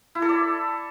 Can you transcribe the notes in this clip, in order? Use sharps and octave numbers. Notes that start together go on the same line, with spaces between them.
E4
A4
D5